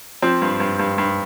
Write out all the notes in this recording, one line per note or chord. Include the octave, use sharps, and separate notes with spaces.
F3 C4
G2
G2
G2
G2